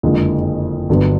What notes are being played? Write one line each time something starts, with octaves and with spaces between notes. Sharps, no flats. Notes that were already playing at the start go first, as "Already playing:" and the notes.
F#1 F2 D3 F3 G#3
G1 G2 D3 F#3 B3